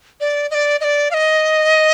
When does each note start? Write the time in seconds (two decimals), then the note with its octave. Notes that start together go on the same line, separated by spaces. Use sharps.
0.21 D5
0.51 D#5
0.55 D5
0.81 D#5
0.84 D5
1.11 F5
1.14 D#5